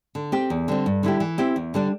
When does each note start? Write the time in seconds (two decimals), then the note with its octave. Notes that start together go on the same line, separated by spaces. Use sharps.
0.15 D3
0.32 C4 G4
0.50 E2
0.68 D3 G3 C4
0.86 G2
1.03 D3 G3 E4 G4
1.20 E3
1.38 C4 E4 G4
1.56 E2
1.74 D3 G3 D4